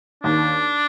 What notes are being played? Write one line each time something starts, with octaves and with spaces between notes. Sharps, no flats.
D#2 D4